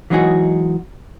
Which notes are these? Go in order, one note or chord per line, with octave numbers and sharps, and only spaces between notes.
E3 F#3 G#3 D#4 F#4 G#4